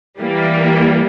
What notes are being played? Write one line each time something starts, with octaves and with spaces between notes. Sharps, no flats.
E3 G3 A#3